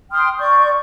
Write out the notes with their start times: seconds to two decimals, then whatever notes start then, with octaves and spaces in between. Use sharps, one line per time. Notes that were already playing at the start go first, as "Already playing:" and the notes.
0.12 G5 C6 D#6 F6
0.38 D5 C#6 G6